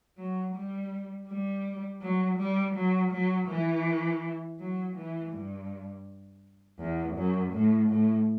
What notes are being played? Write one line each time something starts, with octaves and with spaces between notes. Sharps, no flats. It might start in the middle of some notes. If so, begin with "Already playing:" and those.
F#3
G3
G3
F#3
G3
F#3
F#3
E3
F#3
E3
G2
E2
F#2
A2
A2